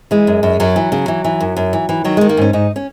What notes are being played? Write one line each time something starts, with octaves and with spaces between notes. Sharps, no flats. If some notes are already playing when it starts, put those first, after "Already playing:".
E3 G#3
F#2
F#2
F#2 F#3
E3
C#3
E3
E3
F#2
F#2
E3
E3
D#3 F#3
D#3 G#3
A#3
G#2 C#4
G#2 D#4
C#4